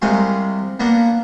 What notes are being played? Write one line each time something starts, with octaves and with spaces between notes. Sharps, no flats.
C2 C3 G#3 F5 G#5 C6
A#3 B3 D4